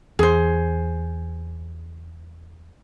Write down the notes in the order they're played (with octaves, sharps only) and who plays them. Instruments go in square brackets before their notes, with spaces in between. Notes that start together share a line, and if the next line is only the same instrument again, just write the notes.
[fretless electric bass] E2 [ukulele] G#4 C5